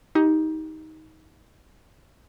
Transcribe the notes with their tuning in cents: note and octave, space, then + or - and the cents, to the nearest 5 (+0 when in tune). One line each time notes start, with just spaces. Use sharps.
D#4 +20 G4 +0